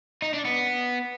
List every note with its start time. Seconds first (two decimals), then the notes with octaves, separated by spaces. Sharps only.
0.22 D#4
0.34 D4
0.45 B3